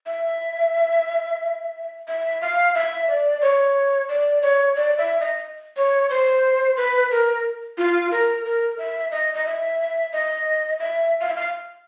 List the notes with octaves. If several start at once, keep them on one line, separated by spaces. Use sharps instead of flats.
E5
E5
F5
E5
D5
C#5
D5
C#5
D5
E5
D#5
C#5
C5
B4
A#4
F4
A#4
A#4
E5
D#5
D#5
E5
D#5
E5
F5
E5
F5